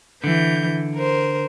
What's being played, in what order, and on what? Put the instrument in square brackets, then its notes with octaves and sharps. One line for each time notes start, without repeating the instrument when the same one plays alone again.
[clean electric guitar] D3 [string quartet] E3 G6
[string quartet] A#4 C5